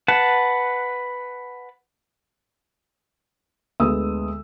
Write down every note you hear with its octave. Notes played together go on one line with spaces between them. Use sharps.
B4 F#5 A5
D2 G#3 B3 D#6 E6